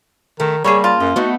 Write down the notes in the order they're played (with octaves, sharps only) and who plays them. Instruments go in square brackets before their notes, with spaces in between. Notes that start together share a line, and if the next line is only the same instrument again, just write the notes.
[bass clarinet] D#3 [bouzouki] A3
[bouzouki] C#3 A#3 [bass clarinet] G3 [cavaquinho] G#4 A4 C#5
[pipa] F4 [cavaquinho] A5
[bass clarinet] F#2 [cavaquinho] D#5
[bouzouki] A3 B3 D#4 [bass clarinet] F#4